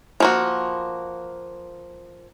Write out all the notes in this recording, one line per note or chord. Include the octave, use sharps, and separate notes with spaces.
F3 A#3 F#4